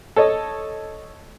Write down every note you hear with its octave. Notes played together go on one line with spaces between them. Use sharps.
A4 C#5 D#5